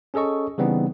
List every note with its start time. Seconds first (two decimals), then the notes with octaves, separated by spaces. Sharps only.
0.14 C#4 G#4 A4 D#5 C#6
0.58 C#3 E3 G3 B3 C4 D#4